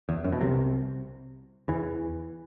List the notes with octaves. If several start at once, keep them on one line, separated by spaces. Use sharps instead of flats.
E2
F#2
B2
C2 C3
E2 E3